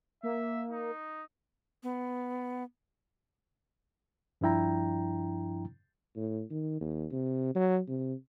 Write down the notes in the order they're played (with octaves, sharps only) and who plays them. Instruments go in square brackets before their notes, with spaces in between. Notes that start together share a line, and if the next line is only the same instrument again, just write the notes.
[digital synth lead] A#3 [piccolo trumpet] E5
[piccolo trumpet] D#4
[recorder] B3
[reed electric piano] G2 F3 D4 E4 G5 A#5
[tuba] A2
D#3
D#2
C3
F#3
C3